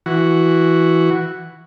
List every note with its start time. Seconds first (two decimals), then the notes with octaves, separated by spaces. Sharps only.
0.06 E3 F#4